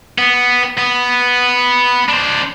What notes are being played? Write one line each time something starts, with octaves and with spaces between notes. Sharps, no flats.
B3
B3
D4 C5